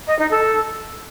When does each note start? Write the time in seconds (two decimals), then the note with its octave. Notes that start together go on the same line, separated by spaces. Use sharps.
0.07 D#5
0.18 D#4
0.30 A4